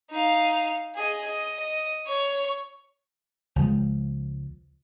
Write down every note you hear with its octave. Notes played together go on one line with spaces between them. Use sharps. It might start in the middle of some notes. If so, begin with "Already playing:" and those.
D#4 F5
G#4 D#5
D#5
D#5
C#5 C#6
C#2 F3 G#3